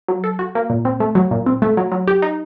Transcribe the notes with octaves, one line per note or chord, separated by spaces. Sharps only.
F#3
A4
F#4
A#3
A#2
C4
A3
F#3
A#2
C4
A3
F#3
F#3
G4
D#4